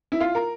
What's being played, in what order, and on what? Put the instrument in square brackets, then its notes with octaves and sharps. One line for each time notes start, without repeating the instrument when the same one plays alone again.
[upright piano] E4
F4
A#4